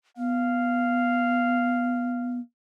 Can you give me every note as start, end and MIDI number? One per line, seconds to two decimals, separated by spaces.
0.17 2.39 59
0.17 2.41 77